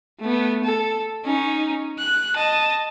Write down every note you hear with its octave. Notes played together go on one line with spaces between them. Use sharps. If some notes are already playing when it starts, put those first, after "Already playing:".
A3 B3
A4
C#4 D#4
F#6
D#5 A5